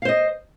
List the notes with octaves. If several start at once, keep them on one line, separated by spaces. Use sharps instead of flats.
C5 D#5 F5